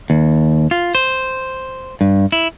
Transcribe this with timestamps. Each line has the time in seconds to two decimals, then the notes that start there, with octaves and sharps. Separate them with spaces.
0.10 D#2
0.71 F4
0.95 C5
2.01 G2
2.32 E4